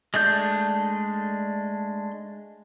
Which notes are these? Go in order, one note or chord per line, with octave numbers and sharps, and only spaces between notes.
G#3 A3 D4 G6